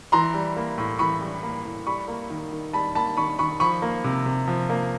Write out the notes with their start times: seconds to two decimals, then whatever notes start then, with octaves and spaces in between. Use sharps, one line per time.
0.12 E3 A#5 C6
0.34 G3
0.56 A#3
0.78 A2
0.99 E3 B5 C#6
1.21 G3
1.43 A#3
1.65 A2
1.86 G3 B5 C#6
2.08 A#3
2.30 D#3
2.52 D#3
2.73 G3 A5 B5
2.95 A#3 A5 B5
3.17 D#3 B5 C#6
3.39 D#3 B5 C#6
3.60 F3 B5 C#6
3.82 A#3
4.04 C3
4.26 C3
4.48 F3
4.70 A#3